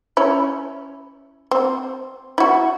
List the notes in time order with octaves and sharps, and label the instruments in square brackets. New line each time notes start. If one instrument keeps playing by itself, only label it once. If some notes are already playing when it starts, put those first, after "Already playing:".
[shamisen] C#4 E4
C4
E4 F#4